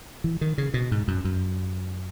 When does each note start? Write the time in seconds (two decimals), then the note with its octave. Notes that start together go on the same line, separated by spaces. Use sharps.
0.24 E3
0.41 D#3
0.58 C#3
0.74 B2
0.91 G#2
1.08 F#2
1.25 F#2